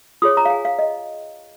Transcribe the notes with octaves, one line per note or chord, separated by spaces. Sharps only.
F4 G#4 C#5 D#6
A#5
F5
G#5
F5
D#5